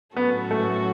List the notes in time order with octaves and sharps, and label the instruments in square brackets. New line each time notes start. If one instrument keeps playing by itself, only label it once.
[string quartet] A2 F#3 C#4 F#4 A4 [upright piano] B3
[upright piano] A3